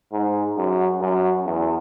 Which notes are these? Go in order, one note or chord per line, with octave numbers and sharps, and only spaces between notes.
G#2
F#2
F#2
E2